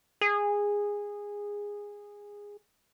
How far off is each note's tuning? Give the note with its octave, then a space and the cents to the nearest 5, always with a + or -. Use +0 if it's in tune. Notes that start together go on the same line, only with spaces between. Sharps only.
G#4 -15